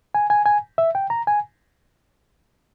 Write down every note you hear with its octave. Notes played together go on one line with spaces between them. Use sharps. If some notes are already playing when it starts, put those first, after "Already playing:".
G#5
G#5
G#5
E5
G5
A#5
G#5